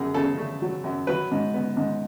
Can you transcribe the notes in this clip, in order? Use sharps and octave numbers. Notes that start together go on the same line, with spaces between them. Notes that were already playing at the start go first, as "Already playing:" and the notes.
Already playing: F#2 G#4
C#3 A4
A3
F#3
F#2
F#3 B4
G#2
B3
G#2